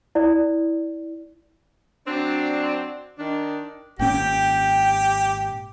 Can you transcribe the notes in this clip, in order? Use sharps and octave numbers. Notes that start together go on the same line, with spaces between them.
E4 D5
F#3 C4 D4
D#3 D4
G#1 A#2 C#4 G4 G5